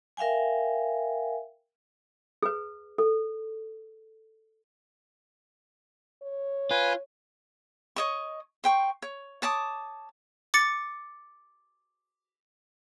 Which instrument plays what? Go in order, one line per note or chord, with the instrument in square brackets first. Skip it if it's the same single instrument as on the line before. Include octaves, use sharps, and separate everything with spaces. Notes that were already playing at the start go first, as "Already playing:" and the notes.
[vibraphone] A#4 E5 F5 G5 G#5
[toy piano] G#4 B4
A4
[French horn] C#5
[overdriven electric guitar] F4 [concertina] B4 G#5
[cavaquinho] C#5 D#5 C#6
C5 G5 C#6
C#5
C#5 A5 D6 D#6
[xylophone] D6 A6 C#7